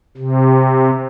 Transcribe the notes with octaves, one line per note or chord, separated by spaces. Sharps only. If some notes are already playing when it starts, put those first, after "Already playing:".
C3